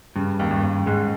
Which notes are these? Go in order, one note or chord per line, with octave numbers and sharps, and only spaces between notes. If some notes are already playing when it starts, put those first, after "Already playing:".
G2 C#3
D#2
G2
D#2
G#2 G#3